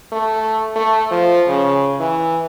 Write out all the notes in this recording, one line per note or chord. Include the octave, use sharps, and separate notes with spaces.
A3
A3
F3
C#3
E3